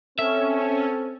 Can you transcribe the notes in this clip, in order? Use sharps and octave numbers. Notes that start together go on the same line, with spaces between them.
C4 C#4 A4 E5